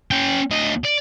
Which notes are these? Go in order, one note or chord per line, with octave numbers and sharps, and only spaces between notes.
C#4 G5
D2 D#5
D5